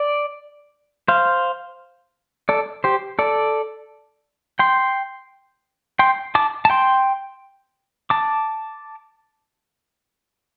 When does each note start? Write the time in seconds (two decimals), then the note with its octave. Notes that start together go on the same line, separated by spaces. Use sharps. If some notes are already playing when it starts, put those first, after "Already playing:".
Already playing: D5
1.08 C5 F5
2.49 A4 D5
2.84 G4 C5
3.19 A4 D5
4.59 G5 C6
5.99 G5 C6
6.35 A5 D6
6.65 A5
6.70 G5 C6
8.10 A5 D6